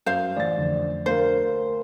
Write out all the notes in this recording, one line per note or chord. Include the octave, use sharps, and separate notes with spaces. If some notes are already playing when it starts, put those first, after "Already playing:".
F#2 C5 F5
A1 D5 A6
F2 D3
D2 A#4 C5 F5 C6